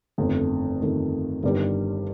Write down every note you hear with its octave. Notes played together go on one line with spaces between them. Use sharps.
G1 F2 D#3 A3
G1 F2 D#3 A3
G1 G2 D#3 G3 D4